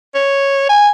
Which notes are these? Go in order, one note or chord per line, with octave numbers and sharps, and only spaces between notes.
C#5
G#5